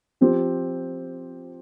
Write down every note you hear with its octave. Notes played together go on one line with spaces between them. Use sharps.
F3 C4 G4